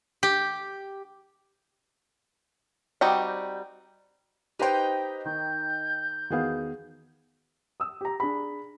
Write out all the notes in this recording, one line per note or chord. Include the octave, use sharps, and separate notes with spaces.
G4
G3 C4 D#4 F#4 G5
D#4 G4 B4 C5 G5
D#3 G6
E2 D#3 B3 F#4 G#4 F5
D#6 E6
G4 A#5
D4 G#4 B5